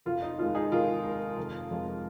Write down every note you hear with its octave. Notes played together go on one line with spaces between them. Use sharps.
F1 F4
D#4
D#2 D#3 G#3 F4
D#4 G#4
F1 F4 A#4
D#2 D#3 G#3
F1
F2 F3 G#3